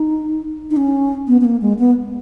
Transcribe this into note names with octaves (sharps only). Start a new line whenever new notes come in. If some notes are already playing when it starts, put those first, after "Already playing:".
Already playing: D#4
D#4
C#4
B3
B3
A#3
G#3
B3